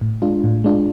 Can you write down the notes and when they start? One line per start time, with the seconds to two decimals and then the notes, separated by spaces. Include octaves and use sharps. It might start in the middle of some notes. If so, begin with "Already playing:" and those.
0.01 A2
0.22 G#3 D4 F4
0.44 A2
0.64 G#3 D4 F4